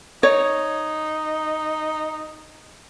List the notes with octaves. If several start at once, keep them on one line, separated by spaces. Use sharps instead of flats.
D#4 C#5